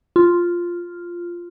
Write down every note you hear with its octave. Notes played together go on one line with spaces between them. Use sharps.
F4